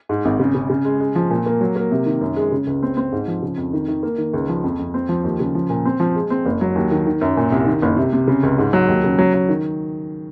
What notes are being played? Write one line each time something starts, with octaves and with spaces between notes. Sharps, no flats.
G#2
G#1
C#3
C#3
C#3
G#3
G#3
F3
A#2
A#3
F#3
A#3
C3
D#3
F#2
G#3
C#3
C#2
C4
C4
G#2
F3
C#3
F2
D#3
D#3
A#3
D#3
C#2
F3
F2
F2
C4
F3
D#2
C#3
F3
A#2
C4
F3
G#3
C4
F#1
F#3
D#2
D#3
D#3
F#2
A#2
C2
D#3
F#1
C3
C3
C#3
C#2
G#2
F#3
D#2
C#3
F#3
F#3
D#3